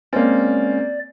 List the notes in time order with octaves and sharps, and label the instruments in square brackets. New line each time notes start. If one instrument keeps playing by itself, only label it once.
[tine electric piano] G#3 C#4 [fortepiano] A#3 C4 [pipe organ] D5